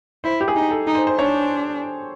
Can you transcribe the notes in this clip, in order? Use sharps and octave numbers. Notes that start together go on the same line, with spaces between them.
E4 C5
G4
G#4
D#4
A4
D#4
C5
C5
D4 C#5